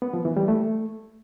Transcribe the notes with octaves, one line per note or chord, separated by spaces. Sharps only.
B3
F3
E3
G3
A3